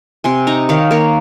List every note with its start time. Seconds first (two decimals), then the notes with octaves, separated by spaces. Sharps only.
0.24 C3 G#5 C6
0.47 D#4 A#5 C#6
0.69 D#3 C#5 F5
0.91 A#3 A#4 C#5